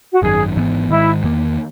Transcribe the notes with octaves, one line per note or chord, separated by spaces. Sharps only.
F#4
G#1 F#2 D#3 G#4
G#1 G#2 E3 B3
G#2 D#3 G#3 E4
E2 D#3 A#3